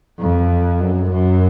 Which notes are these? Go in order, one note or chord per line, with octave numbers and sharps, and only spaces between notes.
F2
F#2
F#2